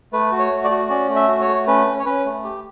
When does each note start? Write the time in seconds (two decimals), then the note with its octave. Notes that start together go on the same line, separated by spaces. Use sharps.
0.13 A3 B4
0.32 F#4
0.39 C#5
0.51 A3
0.64 D5
0.70 F#4
0.90 C#4 D5
1.09 A3
1.16 E5
1.28 F#4
1.41 C#5
1.48 A3
1.67 C#4 B4
1.87 C#4
1.99 C#5
2.06 C#4 B4
2.25 A3
2.44 G4